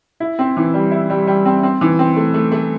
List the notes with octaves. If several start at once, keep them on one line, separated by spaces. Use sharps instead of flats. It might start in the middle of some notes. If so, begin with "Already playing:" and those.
E4
C4
E3
G3
E4
G3
G3
C4
C4
E3
C4
A3
A3
A3